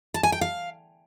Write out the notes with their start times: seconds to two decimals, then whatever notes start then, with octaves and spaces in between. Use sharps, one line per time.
0.14 A5
0.23 G#5
0.32 G5
0.41 F5